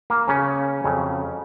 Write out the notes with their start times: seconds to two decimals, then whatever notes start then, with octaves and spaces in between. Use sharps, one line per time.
0.10 A#3 A#4
0.28 C#3 C#4
0.84 F2 C#3 F#3